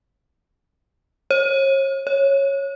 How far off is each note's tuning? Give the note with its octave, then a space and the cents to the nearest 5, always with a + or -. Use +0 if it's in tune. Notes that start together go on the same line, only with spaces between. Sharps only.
C#5 -40
C#5 -10